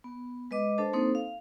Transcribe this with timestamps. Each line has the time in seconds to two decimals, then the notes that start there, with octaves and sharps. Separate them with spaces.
0.04 B3
0.51 G#3 B4 D#5 D6
0.78 D4 A4 C5 A5
0.93 A#3 C4 D#4 A4 C5
1.15 F5